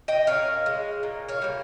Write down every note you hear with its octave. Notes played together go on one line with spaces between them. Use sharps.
D#5 G5
A#2 C#5 F5
G#3
A#2
C#5 F5
G3 A#3